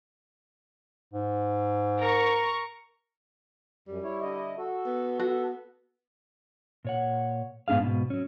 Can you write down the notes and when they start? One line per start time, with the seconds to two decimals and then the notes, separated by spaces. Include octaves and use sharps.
1.14 G#2
1.99 A#4 A#5 C#6
3.88 F#2 G3
4.04 E4 C#5
4.21 D3 E4 D#5
4.58 F#4 A4
4.86 B3
5.20 F#4 A4
6.85 A#2 C#5 F#5
7.68 G#2 B3 D4 G#4 F5
7.80 G#2 B2
8.10 F#3 C#4